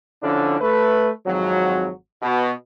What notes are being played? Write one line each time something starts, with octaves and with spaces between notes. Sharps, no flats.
D3 F3 C#4 D4 E4
A3 B4
G#1 F2 F#3
B2